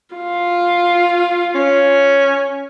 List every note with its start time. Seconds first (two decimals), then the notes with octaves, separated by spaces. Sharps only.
0.15 F4
1.55 C#4